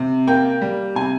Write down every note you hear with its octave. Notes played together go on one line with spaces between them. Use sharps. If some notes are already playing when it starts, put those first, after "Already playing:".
Already playing: C3
A#3 G5
G3
C3 G#5